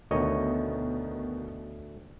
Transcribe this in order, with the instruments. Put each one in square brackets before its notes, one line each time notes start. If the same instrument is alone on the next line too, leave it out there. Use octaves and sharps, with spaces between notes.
[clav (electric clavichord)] D2 C#5 D#5 [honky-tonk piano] B2 D#3